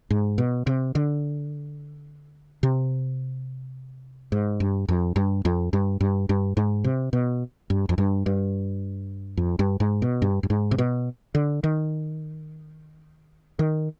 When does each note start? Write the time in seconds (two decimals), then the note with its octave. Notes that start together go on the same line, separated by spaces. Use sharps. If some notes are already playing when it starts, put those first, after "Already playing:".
0.10 G#2
0.38 B2
0.67 C3
0.95 D3
2.63 C3
4.32 G#2
4.60 G2
4.89 F2
5.16 G2
5.45 F2
5.73 G2
6.01 G2
6.29 G2
6.57 G#2
6.84 C3
7.13 B2
7.70 G2
7.89 F2
7.98 G2
8.26 G2
9.37 F2
9.59 G2
9.80 G#2
10.02 B2
10.22 G2
10.43 G2
10.50 G#2
10.71 C3
10.78 B2
11.35 D3
11.64 D#3
13.59 D#3